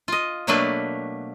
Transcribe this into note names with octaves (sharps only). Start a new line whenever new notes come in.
F4 D#5
B2 F#3 A3 A#3 D4 B4